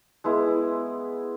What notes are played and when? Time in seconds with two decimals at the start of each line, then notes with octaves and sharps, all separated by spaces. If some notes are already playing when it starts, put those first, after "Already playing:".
0.24 G#3 B3 E4